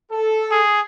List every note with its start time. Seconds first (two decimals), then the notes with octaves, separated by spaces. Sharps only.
0.12 A4
0.51 G#4